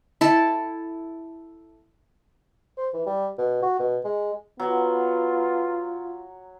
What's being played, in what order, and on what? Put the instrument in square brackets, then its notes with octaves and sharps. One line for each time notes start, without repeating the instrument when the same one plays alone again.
[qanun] E4 A4 A5
[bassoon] C5
E3
G3
B2
F#4
B2
G#3
[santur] F#3 [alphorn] B3 [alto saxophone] F4